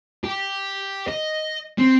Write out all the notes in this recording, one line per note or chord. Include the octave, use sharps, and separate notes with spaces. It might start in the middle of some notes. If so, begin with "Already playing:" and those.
G4
D#5
C4